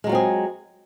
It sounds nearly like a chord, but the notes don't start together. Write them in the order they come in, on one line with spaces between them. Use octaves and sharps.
G#3 F#3 F4 C4 G#4